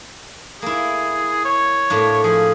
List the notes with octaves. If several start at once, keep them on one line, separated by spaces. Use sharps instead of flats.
A#3 E4 G#4
C#5
A2 A#3 D4
F3 G#4